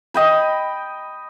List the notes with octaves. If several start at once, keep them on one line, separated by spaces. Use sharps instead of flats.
D#5 G5 B5